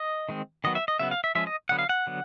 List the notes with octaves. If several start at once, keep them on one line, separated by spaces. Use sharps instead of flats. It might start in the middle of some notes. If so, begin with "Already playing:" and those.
Already playing: D#5
D#3 G#3 C4
D#3 F#3 B3 D#5
E5
D#5
C#3 F#3 B3 E5
F5
E5
F3 G#3 C#4 E5
D#5
D3 F#3 B3 F#5
F5
F#5
D3 F#3 B3